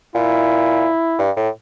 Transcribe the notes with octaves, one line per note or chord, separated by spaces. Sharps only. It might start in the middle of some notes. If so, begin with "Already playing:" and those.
A#2 E4
G2
A2